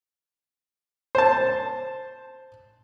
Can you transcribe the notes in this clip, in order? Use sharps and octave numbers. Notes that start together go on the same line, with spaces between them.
C5 A5